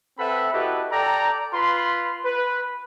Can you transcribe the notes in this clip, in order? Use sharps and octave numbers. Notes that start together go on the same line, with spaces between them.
C4 A4 B4 E5 F#5 B5
E4 F#4 G4 A4 B4 D#5
A4 D5 G5 A#5
F4 B4 B5 C6
B4